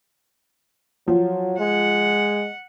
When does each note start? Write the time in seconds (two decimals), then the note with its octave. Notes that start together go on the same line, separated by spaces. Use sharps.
1.08 F3 F#3
1.59 G#3 F#5